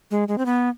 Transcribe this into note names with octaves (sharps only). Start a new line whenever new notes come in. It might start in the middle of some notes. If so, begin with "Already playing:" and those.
G#3
G#3
C4
B3